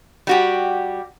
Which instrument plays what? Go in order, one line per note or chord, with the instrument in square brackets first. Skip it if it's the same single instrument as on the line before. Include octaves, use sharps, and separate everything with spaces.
[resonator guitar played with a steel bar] G3 F#4 G4